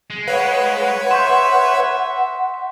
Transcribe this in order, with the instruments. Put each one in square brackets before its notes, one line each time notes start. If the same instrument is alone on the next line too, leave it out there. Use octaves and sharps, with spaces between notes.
[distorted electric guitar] G#3
[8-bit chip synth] B4 C#5 [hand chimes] F5 [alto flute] F#5
[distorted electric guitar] E5 [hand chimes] C6 C#6 G6